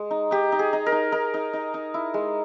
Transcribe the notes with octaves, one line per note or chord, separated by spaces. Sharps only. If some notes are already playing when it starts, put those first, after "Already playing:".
Already playing: G#3
D#4
D#4 G4
D#4
G#4
D#4
A#4
D#4
D#4 A#4
D#4
D#4
D#4
E4
G#3